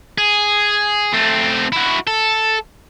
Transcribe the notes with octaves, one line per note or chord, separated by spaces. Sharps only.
G#4
A3 C4
E4 F#4
A4